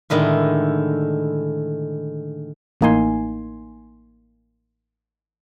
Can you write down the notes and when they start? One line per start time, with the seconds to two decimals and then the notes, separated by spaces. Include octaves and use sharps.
0.10 A2 D3 D#3 G#3 E4
2.81 A1 A2 A#3 D#4 G#5 C6